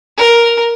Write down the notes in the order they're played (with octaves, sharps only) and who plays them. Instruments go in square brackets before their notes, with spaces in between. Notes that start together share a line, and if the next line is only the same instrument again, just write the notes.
[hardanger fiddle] A#4